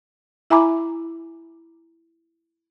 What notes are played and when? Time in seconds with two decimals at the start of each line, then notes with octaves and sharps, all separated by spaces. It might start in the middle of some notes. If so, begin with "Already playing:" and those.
0.50 E4 E5 G#5 A#5 B5 D6